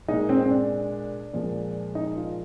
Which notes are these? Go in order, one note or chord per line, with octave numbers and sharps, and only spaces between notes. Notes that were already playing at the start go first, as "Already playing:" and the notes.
A#2 G#3 D#4
C4
C4
D4
A#2 F3 G#3
D#4
F4